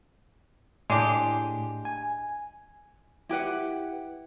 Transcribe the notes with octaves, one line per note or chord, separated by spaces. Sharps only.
A2 G#3 D4 G4
G#5
E4 G4 B4 F#5